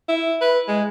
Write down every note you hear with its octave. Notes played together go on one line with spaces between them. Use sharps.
E4
B4
G#3